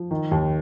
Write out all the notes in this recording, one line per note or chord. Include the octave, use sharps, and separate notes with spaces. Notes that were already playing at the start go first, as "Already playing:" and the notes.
Already playing: F3
D#3
D#2